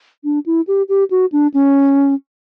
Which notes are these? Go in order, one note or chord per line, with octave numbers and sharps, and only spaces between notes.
D4
E4
G4
G4
F#4
D4
C#4